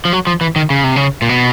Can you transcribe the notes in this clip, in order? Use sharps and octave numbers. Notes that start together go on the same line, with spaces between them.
F3
F#3
F3
E3
D#3
C#3
C3
C#3
A#2
B2